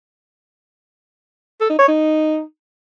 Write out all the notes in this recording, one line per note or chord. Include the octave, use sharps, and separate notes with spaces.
A4
D#4
C#5
D#4